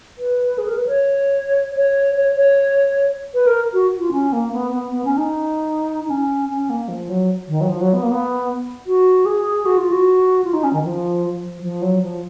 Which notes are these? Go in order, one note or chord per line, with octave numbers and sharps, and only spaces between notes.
B4
G#4
A#4
B4
C#5
C#5
C#5
C#5
B4
A#4
F#4
F4
C#4
A#3
B3
B3
B3
C#4
D#4
D#4
C#4
C#4
A#3
F3
F#3
D#3
F#3
F3
F#3
B3
A#3
B3
F#4
G#4
F#4
F4
F#4
F4
D#4
C#4
D#3
F3
F3
F3
F#3
F3